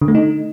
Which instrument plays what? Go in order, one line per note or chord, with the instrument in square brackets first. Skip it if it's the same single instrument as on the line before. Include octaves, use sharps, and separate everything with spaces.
[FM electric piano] D3
A3
D#4